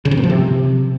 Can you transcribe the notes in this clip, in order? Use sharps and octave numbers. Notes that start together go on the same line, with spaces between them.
C#3
C3
A#2
F3
C3